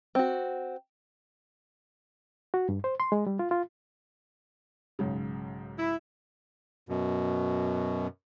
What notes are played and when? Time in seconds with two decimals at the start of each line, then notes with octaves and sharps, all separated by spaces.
0.15 C4 F#4
2.54 F#4
2.69 G2
2.84 C5
3.00 C6
3.12 G#3
3.27 G3
3.39 F4
3.51 F4
4.99 B1 G#2 C#3
5.79 E4
6.89 F#2 B2